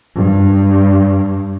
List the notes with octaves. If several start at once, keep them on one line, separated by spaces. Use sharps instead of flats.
G2